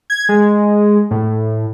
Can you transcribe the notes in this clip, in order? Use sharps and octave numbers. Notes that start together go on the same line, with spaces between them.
G#6
G#3
A2